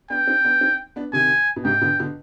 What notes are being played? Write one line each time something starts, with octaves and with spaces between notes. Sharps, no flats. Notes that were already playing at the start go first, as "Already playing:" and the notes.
B3 D4 G5
C4 D#4
B3 D4
C4 D#4
B3 D4
C3 D#3 G#5
B2
G#2 C3 G5
B2 D3
B2 D3